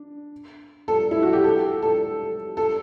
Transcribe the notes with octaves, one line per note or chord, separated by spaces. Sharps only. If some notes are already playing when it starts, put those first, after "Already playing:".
Already playing: D4
A4
E4
F#4
G4
A4
A4
A4